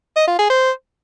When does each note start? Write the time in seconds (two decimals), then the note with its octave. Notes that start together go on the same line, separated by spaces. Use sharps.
0.16 D#5
0.28 F4
0.39 G#4
0.50 C5